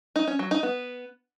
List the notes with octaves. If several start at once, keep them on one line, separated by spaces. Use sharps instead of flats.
D#4
C#4
F#3
D#4
B3